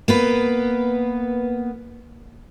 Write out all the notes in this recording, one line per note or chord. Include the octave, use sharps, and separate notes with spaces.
A#3 B3 B4